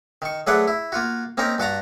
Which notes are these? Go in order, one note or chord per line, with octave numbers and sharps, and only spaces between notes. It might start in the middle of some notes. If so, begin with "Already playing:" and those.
D#3 C#6
F#3 A3 G#4 B4 D5 F#5
E4
A#3 F4 F#4
A#3 C4 C#4 D#4 A#4
G2 F#4 A5 A#5